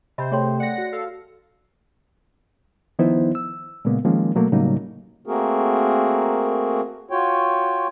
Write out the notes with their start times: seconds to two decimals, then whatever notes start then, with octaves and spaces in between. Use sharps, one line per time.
0.18 C3 C5 D#5 E5 B5
0.32 A3 G#4 A4 C#5 G5 C6
0.60 D5 F#5 A#6 C#7
0.78 F#4
0.92 A4 F5
2.99 D#3 F3 B3 D#4 E4 C5
3.35 E6
3.85 A#2 C#3 G#3 A#3 B3
4.05 D#3 F3 G#3 A#3 C#4
4.35 B2 F#3 A3 A#3
4.52 A2 C#3 F#3 G3 A#3 D#4
5.26 A3 A#3 C4 F#4 G#4 A#4
7.11 F4 F#4 C#5 G5